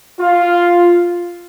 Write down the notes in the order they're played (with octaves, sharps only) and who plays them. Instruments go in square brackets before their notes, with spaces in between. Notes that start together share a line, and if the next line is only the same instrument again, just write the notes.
[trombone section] F4